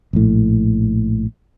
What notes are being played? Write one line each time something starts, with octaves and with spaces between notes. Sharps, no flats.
A#1 A2